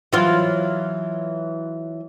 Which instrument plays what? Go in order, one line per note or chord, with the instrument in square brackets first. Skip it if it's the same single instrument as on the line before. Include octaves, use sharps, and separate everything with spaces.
[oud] E3 F#3 F4